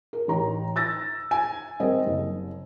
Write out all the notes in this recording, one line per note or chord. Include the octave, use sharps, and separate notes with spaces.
A#4
A1 A#5
E6 A6 A#6
G#5
G3 C4 A#4 D#5
F#1